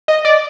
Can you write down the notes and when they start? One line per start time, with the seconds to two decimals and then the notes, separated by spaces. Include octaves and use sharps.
0.08 D#5
0.25 D5